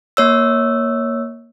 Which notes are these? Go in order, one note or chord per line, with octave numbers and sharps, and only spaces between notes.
A#3 C#5 E6